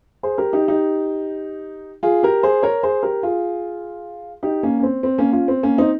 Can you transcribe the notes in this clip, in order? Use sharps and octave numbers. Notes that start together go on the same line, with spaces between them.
G#4 C5
G4 A#4
D#4 G4
D#4 G4
F4 G#4
G4 A#4
G#4 C5
A#4 C#5
G#4 C5
G4 A#4
F4 G#4
D#4 G4
A#3 C#4
C#4
C4
C4
A#3 C#4
C#4 F4
C4
A#3 C#4
C4 D#4